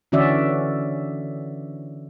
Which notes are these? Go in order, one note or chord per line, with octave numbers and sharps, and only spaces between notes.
D3 E3 C#4 F#4 D5 E5